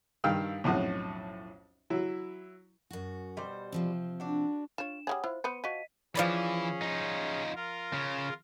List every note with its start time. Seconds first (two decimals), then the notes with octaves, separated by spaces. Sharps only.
0.24 G2 D#3 F5 G5 E6 F6
0.64 B1 F2 A2 C#4 F#5
1.90 F#3 E4
2.91 F#2 F#4
3.37 B2 G3 C5
3.72 C3 F3 C4
4.20 D4 F#4
4.78 D4 F4 C#5 E7
5.07 G3 G#3 G#4 C#5 F#5 D#6
5.24 E4 F4 C5
5.44 B3 B4 C5 C#7 D#7
5.64 F3 F#4 D#5 B6 D#7
6.15 E3 F3 C#4 G#4 D5 B5
6.82 D#4 F4
7.55 F4 A#4
7.93 C#3